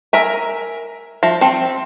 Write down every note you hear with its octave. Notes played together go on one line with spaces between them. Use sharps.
A#4 E5 G#5
F3 E5
C4 G5 A5